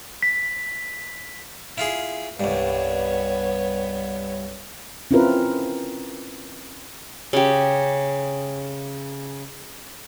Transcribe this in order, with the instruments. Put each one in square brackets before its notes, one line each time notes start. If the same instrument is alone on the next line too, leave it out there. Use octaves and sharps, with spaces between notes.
[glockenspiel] B6
[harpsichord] E4 F4 G#4
[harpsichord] C2 G2 [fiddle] B3 C#5
[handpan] C4 C#4 E4 F4 A#4 B4
[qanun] C#3 G4